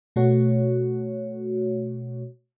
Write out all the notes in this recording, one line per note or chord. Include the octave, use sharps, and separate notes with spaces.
B2 A3 F#4 C#5